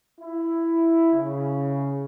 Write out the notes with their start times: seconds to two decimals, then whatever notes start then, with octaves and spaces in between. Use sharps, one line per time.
0.20 E4
1.12 C#3